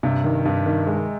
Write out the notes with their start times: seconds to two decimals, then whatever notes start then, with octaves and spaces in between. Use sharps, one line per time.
0.03 G2 C3
0.24 D#3
0.45 G2
0.66 D#3
0.87 G#3